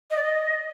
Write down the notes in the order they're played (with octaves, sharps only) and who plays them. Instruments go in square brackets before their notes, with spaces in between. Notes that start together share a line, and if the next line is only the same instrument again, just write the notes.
[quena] D#5
D5
D#5